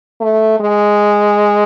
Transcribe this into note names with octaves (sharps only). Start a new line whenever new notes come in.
A3
G#3